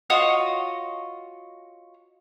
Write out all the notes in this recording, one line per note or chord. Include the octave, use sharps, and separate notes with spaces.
F4 F#4 C#5 D#5